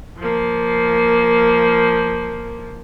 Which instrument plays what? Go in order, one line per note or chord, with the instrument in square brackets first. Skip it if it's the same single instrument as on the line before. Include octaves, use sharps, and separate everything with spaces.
[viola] F3 A#3